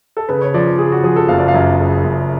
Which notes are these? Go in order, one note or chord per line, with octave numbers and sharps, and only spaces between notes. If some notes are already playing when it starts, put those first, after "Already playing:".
A4
C#3 B4
C#5
F3 D5
C#3 G#4
F#4
F3 G#4
A4
F#1 F5
D5
F5
F#2
C#3
F#1